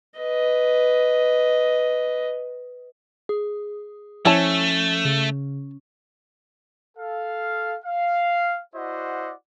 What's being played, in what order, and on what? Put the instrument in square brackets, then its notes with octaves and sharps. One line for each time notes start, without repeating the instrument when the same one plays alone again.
[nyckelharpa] B4 D#5
[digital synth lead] G#4
[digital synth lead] F3 [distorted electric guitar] A3 [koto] C#4 [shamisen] E4 C#5 A5
[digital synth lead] C#3
[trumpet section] A4 F5
F5
E4 F#4 C5 D5 D#5 F#5